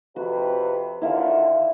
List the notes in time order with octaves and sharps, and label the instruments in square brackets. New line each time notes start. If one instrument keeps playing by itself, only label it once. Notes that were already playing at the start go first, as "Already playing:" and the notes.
[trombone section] F2 C3 B4 [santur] F#4
[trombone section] D#2 D3 F4 [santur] E4 E5 F5